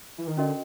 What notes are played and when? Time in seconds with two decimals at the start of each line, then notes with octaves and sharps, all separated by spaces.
0.18 E3
0.28 D#3
0.37 D3 C#4 F#4 A#4 D#5